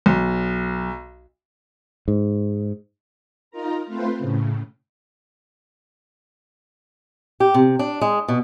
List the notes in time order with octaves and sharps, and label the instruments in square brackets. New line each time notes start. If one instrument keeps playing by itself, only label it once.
[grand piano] B1
[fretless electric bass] G#2
[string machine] D#4 F4 A#4 A#5
A3 C4 F4 B4 C5
A2 C#3
[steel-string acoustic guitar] G4
C3
D4
G#3
B2